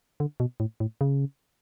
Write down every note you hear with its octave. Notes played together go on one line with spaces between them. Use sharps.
D3
B2
A2
A2
C#3